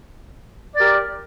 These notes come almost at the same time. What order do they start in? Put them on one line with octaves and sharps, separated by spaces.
D5 A#4 G4